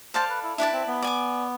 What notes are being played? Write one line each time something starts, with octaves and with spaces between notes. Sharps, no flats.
A4 C5 D5 F5 A5
B4
E4
D4 E4 B4 D5 A5
C4
B3
D5 G#5 D6